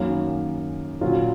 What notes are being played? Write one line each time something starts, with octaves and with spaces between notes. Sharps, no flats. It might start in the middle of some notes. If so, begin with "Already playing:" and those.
Already playing: F#2 D#3 A#3 C#4 F#4
A#2 F#3 C#4 F4